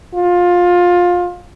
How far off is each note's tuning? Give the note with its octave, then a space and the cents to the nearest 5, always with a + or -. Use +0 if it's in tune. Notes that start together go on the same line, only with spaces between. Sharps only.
F4 +20